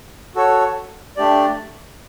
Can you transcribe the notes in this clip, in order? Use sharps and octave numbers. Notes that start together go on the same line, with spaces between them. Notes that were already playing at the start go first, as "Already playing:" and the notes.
F#4 A4 C#5
A3 D4 G4 D5